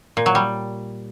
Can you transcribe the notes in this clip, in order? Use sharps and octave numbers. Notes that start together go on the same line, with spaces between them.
A#2
F#3
G3